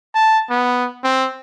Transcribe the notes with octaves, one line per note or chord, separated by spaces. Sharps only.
A5
B3
C4